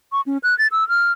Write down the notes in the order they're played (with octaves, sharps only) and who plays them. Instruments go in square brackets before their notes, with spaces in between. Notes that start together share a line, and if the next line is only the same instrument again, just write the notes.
[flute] C#6
C#4
F#6
A6
E6
F6